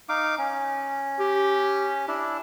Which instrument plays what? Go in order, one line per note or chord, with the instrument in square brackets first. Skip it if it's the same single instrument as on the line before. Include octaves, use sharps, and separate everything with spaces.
[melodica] D#4 F5 D6
C#4
[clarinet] G4
[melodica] D4 E4